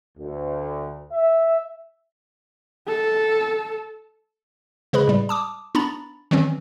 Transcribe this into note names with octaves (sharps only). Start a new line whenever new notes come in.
D2
E5
A4
C#3 G#3 G#4 B4 B5
A2 G3
A5 D6 D#6
B3 D4 A#5 B5 A6
D#3 E3 F#3 C4 C#4